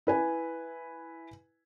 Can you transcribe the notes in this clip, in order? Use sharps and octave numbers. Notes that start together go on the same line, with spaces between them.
E4 B4 G#5